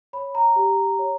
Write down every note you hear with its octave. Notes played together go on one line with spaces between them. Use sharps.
C#5 B5
A#5
G4
C#5